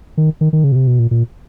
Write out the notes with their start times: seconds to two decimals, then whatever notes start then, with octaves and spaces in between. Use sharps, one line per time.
0.17 D#3
0.41 D#3
0.53 D#3
0.64 C#3
0.72 B2
0.76 C3
0.87 B2
0.99 A#2
1.11 A#2